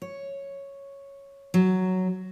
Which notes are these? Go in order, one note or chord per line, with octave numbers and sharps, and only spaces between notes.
C#5
F#3